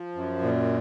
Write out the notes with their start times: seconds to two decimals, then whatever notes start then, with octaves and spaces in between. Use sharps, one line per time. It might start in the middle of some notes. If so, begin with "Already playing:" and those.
Already playing: F3
0.15 F#2
0.42 A#2